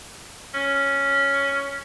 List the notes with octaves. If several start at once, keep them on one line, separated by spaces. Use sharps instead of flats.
C#4